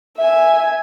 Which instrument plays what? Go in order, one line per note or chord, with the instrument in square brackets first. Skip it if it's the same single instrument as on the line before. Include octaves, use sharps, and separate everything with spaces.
[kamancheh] E5 G#5